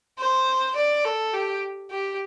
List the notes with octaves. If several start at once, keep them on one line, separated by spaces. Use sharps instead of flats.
C5
D5
A4
G4
G4